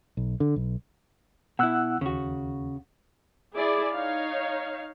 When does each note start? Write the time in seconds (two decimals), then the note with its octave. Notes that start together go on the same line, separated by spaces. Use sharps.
0.17 B1
0.40 D3
0.56 B1
1.59 B2 E4 F#5 E6 F#6
2.01 D#2 C#3 F#4
3.54 E4 G#4 D5
3.93 D#4 C#5 F5